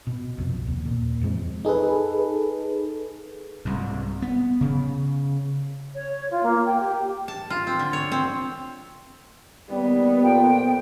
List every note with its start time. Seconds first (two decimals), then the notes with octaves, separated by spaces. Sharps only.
0.07 B2
0.38 C2 F2 B2
0.67 D#2
0.85 A#2
1.21 F2 E3 G#3 C4
1.65 D#4 G#4 A4 B4
3.65 C2 G#2
4.22 B3
4.61 C#3
5.94 C#5
6.30 F4
6.43 A#3
6.65 G5
6.80 G4
7.28 A5
7.50 F4
7.67 C4
7.79 D3
7.93 C#5
8.12 C4
9.70 D#2 G3 B3
10.22 F2 A#2 G5